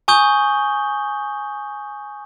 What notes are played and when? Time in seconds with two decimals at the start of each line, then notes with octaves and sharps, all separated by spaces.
0.08 G#5 C#6 D#6 G6 G7